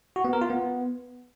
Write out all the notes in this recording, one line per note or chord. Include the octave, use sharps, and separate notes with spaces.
F#4
B3
A#4
F4
B3